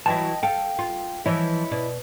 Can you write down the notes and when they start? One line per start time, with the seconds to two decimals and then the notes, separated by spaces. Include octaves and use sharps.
0.06 E3 F#3 E4 D#5 G5 A5
0.43 A4 F5 G5
0.79 F4
1.26 E3 F3 E4 C#5 D#5
1.71 B2 D5